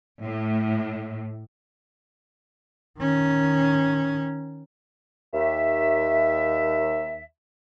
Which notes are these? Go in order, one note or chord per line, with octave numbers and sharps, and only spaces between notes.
A2
D#3 C#4
D#2 E5